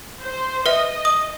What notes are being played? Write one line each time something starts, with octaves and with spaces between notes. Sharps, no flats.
C5
B4 D#5 E5
D#6